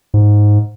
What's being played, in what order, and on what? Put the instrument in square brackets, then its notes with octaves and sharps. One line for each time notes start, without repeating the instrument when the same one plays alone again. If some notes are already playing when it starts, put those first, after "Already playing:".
[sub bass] G#2